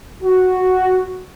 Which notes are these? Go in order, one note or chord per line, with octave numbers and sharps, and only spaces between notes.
F#4